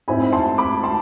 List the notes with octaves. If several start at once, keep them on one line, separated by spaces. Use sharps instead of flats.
G#2 G#3 C4 E4 G#5 B5
A5 C6
B5 D6
A5 C6